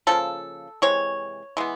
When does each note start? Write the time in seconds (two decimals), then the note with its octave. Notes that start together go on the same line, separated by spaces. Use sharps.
0.07 C#3 F3 A#3 A4
0.82 C3 E3 G#3 C#5
1.57 E3 G#3 B3